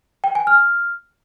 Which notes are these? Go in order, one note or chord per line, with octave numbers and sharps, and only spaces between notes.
G5
G#5
F6